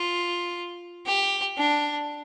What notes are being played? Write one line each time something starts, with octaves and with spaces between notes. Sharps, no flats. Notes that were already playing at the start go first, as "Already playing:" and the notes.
Already playing: F4
G4
D4